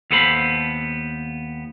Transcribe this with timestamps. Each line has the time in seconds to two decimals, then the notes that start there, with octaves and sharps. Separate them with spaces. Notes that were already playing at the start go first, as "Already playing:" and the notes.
0.11 D#2 B3 A4 C5 B5